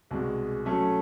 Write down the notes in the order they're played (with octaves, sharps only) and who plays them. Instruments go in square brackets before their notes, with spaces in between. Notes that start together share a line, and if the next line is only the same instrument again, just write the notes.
[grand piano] C2 B2 G#3 [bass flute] G#4
[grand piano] F#3 A3 C#4 [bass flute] A4